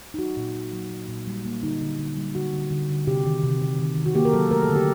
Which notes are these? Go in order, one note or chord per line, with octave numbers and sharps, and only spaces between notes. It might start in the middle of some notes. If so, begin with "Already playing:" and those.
D#4
F#3 F#4
A#2
F#3
F#3
A#3
A#2
G3
A#3
D3 D#4
D3
D3
G3
D3 F#4
D3
D3
D3
C3 G4
D#3
C3
C3
D#3
D#3
F#4
A#3 G4
A#4
F#3 A4
A3 A#4
A4
D3
G4